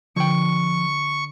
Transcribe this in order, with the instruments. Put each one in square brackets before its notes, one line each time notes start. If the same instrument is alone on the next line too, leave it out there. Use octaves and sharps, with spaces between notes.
[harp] D3 G#6 [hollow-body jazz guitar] F3 G5 [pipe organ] C#6